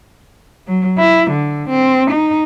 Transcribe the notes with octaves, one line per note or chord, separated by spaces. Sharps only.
F#3
E4
D3
C4
D#4